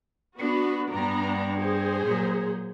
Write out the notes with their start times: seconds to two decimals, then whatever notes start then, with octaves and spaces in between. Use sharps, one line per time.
0.39 B3 D4 F#4 B4
0.92 G2 B3 D4 A#5
1.58 G#4 C5
2.05 A#2 F#3